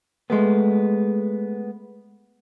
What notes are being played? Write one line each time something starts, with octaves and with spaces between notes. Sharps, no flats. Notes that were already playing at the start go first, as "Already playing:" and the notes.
G#3 A3 B3